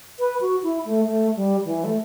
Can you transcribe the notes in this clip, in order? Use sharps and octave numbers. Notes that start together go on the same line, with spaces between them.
B4
F#4
E4
A3
A3
G3
E3
A3